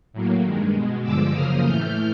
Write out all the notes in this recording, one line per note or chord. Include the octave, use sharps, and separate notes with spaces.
A2 F#3 A#3
G2 D#3 G#3
B2 G#3
G2 D3 F3 G#3 D6 E6
F#2 C#3 F3 A#3 D#6 F6
A2 E3 A3 F6 G6